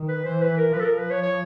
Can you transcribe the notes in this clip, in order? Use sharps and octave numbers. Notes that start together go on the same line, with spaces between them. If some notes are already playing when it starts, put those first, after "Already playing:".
Already playing: D#3
B4
E3 C5
B4
A#4
F3 B4
A4
A#4
B4
C#5
C#5